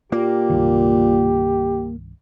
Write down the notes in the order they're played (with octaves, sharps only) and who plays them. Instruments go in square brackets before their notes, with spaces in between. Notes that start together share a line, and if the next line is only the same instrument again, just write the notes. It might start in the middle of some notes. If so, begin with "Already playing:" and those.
[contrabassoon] A#2 [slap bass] A#3 [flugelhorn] G4
[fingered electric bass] C2 G2 D#3